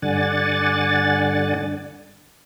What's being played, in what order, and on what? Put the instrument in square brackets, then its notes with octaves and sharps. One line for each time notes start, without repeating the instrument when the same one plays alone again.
[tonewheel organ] G2 D3 D5 F#5 G#5 A6